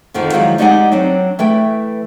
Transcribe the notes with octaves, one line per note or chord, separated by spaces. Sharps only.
F2 D3 D#3 F3
D#3 F3 F#3 G#3 E4 D5
G#3 D#4 G4 D5 F#5 G#5
F#3 C4 D4
E3 A3 B4 G5